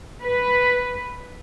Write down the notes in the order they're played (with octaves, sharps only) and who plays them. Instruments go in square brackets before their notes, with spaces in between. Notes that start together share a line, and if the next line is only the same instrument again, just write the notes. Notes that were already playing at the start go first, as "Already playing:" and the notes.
[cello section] B4